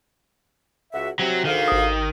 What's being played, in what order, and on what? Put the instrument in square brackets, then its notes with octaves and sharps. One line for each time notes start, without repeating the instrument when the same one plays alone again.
[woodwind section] C#2 F#4 E5
[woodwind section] C3 C4 [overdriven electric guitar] F#3
[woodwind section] D2 G#2 F5 [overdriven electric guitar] D#3
[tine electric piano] G#1 D#6